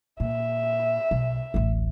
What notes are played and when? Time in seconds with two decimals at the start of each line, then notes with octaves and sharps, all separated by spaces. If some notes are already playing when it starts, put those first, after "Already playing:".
0.20 A#2 E5
1.11 B1
1.54 D1 A1